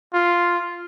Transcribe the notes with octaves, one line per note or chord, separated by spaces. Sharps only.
F4